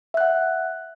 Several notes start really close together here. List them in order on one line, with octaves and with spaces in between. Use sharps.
E5 F#6 F#5